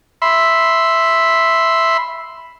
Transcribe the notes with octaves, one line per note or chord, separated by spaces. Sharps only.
E5 B5 C6